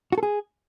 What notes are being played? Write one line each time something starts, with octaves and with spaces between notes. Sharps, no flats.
F#4
A4
G#4